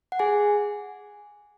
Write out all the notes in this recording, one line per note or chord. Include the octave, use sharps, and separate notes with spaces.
F#5
G#4 G#5